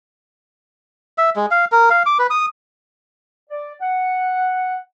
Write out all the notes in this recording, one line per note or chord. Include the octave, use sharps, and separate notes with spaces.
E5
G#3
F5
A#4
F5
D6
B4
D#6
D5
F#5